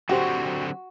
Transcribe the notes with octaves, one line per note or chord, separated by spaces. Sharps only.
D3 F#3 C4 F#4 G4 C5